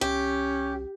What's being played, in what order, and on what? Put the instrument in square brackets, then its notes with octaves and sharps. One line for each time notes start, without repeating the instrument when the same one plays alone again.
[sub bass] C2 [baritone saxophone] C#4 [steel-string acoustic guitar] G4